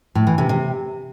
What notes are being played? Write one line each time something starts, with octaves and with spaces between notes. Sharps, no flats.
A2
E3
C3
C3